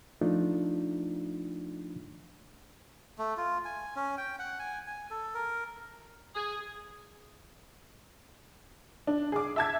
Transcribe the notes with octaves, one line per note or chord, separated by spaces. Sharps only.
F3 A3 D4 D#4 F4
A3
F4
G#5
C#4
G5
F#5
G#5
G#5
A4
A#4
G#4
D4
G#4 D6
E5 A5 G#6